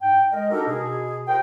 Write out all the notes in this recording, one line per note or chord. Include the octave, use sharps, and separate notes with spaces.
G#2 G5
G#3 A#4 D#5
D4 D#4 F#4 G4 A4 A#4
B2 G#4
F4 G4 A#4 C5 G5